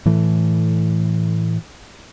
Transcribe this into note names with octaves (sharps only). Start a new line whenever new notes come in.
A2 E3 A3